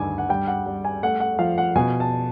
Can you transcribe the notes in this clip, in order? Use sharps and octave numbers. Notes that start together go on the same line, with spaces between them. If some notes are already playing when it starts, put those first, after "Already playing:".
Already playing: D2 G2 D#3 G#5 D6
F#5
G3 G5
F#5
G3
G#5
A3 F#5
F#5
F3 F5
F#5
B2 G#5
A5